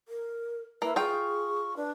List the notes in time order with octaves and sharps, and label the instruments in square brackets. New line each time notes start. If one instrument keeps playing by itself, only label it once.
[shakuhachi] A#4
[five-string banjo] A#3 [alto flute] E4 [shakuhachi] B4
[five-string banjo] F4 G5 [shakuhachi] G#4 [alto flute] C#6
[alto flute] D4 [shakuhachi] B4